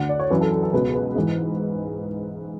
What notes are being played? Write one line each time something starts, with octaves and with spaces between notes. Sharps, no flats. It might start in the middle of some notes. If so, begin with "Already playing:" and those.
Already playing: D2 D3 F#5
D5
C#5
F#2 E3 B4
A4
A4
A4
C#2 B2 B4
B4
G#2 E3